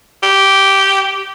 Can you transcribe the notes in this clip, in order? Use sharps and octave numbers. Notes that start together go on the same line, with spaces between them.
G4